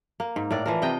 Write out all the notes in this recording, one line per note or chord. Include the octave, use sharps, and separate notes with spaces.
A#3
G#2
A2 A#4 D5
E3 F3 A#4
C3 D#5 G5